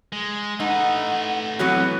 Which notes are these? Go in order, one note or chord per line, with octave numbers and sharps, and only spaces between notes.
G#3
A3 D#4 B4 F#5
E3 F#3 B3 C4 F#4